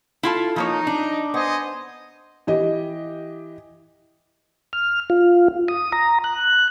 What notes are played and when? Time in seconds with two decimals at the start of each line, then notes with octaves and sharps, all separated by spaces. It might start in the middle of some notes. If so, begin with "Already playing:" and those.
0.23 E4 F4 A4
0.56 F3 A#3 D#4 C#5
0.87 D4
1.34 B3 C5 D#5 G#5
2.47 E3 G4 D#5
4.73 F6
5.10 F4
5.68 D#6
5.93 A#5
6.24 F#6